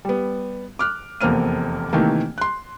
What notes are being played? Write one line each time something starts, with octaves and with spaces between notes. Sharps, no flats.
G3 B3
D6 F6 F#6
F1 E2 A#3 C4 F6 D#7
C3 D#3 E3 A3 A#3
C6 F#6